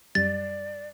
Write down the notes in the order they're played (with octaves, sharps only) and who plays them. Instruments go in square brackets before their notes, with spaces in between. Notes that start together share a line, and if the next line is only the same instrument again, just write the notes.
[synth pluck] F#2 G3 [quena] D5 [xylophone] A6